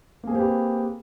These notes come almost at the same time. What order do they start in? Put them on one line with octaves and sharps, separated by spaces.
A#3 G#4 C4 G4 B4